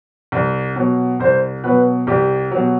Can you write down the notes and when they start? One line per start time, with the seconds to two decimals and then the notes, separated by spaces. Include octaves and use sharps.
0.32 C2
0.76 B2 F#3
1.20 C2 C5
1.64 B2 F#3 B4
2.07 C2 G4
2.51 B2 F#3